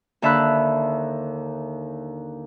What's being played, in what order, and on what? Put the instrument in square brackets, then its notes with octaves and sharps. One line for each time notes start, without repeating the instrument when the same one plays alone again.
[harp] D#2 D3 E5 A5 B5 F#6